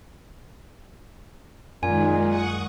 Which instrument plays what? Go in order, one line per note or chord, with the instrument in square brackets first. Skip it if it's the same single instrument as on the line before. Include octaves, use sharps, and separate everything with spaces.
[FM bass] F#2 [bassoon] A#2 [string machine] D#3 G#3 [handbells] G#5
[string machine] F#5 C#6 D#6